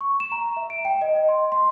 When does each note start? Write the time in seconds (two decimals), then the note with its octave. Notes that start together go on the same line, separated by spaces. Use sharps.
0.01 C#6
0.20 E7
0.32 A#5
0.57 E5
0.70 D7
0.85 G5
1.01 D#5
1.16 D#5
1.29 C6
1.52 C6